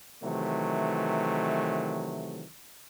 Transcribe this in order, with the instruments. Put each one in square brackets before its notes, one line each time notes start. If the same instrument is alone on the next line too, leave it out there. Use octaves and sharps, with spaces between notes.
[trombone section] C3 D#3 E3 F#3 A3